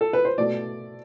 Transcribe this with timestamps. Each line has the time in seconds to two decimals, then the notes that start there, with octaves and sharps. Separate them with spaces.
0.01 A4
0.13 B4
0.25 C5
0.38 B2 A3 D5